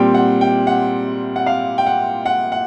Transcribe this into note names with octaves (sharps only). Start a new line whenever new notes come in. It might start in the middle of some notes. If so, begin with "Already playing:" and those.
Already playing: A#2 G3 C4 G5
F#5
G5
F#5
F#5
F5
G5
F#5
F#5
F#5